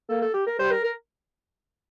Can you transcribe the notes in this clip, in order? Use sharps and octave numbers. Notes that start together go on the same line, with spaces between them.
A#3 A4
A4
G4
A#4
G3 C5
A#4
A#4